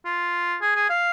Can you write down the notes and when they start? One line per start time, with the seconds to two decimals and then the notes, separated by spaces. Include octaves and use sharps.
0.05 F4
0.61 G#4
0.75 G#4
0.90 F5